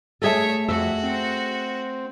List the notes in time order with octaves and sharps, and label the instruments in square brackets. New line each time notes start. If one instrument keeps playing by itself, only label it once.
[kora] A3 G#4 A4 [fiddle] C#5 E5
[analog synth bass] F2 [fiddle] F#4 [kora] E5
[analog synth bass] C4